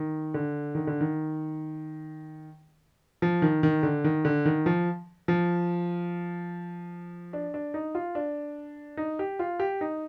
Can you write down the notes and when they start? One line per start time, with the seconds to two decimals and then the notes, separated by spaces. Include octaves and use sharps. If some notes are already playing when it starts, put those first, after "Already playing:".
Already playing: D#3
0.34 D3
0.75 D#3
0.87 D3
1.01 D#3
3.22 F3
3.42 D#3
3.63 D#3
3.83 D3
4.04 D#3
4.25 D3
4.45 D#3
4.66 F3
5.28 F3
7.33 D4
7.54 D4
7.74 D#4
7.95 F4
8.15 D4
8.97 D#4
9.19 G4
9.39 F4
9.60 G4
9.81 D#4